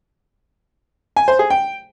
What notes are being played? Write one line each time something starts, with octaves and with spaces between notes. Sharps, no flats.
G#5
C5
G#4
G5